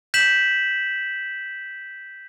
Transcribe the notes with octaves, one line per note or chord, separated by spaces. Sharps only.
G6 B6 E7 F#7